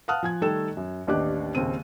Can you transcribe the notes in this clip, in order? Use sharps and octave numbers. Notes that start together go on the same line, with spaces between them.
F5 F#5 A5 D#6 F6 F#6
F3 G#5 G#6
D#3 G3 A3 A4 G5 E7
F#2
A1 D#2 D4 G4 D#5 F#6
D#1 D#2 C#3 C4 D#7